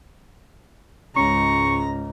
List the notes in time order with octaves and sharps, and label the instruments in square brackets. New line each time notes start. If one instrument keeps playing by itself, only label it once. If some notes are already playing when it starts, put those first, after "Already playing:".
[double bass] C#2 G#2 [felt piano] C#4 [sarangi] A#5 [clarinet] C#6